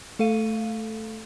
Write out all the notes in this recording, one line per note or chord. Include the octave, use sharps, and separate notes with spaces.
A3 A4 F5 D#7